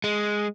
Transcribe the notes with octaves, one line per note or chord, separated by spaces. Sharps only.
G#3